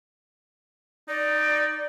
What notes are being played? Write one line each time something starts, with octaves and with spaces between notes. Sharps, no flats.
D#4 D5